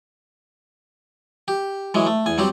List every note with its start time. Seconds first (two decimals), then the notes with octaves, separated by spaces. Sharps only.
1.48 G4
1.94 E3 F#3 G#3
2.06 A3
2.26 E2 G#5
2.38 F#3 G3 C4 G4